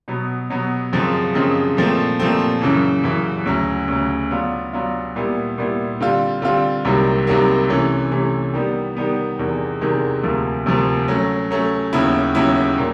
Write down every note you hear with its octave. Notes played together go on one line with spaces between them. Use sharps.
B2 F#3 B3
B2 F#3 B3
F#2 C#3 F3 G#3 C4
F#2 C#3 F3 G#3 C4
A#2 F3 A3 C4
A#2 F3 A3 C4
F#2 C#3 E3
F#2 C#3 E3
D2 C#3 F#3
D2 C#3 F#3
F#3 B3 D4 F4
F#3 B3 D4 F4
A#2 G3 B3 E4
A#2 G3 B3 E4
D3 G3 C4 F4
D3 G3 C4 F4
C2 C3 D#3 F#3 A#3
C2 C3 D#3 F#3 A#3
C3 E3 A3 C#4
C3 E3 A3 C#4
D#3 G3 B3
D#3 G3 B3
E2 C3 D#3 G#3
E2 C3 D#3 G#3
D2 C3 F3 A#3
D2 C3 F3 A#3
F#3 A3 C#4
F#3 A3 C#4
D#2 C#3 F#3 B3 E4
D#2 C#3 F#3 B3 E4
A#2 F#3